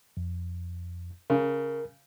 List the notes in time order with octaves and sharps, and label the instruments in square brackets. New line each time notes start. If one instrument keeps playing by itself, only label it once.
[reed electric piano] F2
[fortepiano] C#3 [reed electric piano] A#4